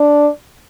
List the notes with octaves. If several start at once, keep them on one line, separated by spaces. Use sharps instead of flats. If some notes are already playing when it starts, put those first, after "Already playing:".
Already playing: D4